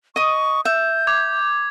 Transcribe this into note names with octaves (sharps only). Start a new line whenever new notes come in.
D#5 C#6 D#6
E5 G6
D6 G#6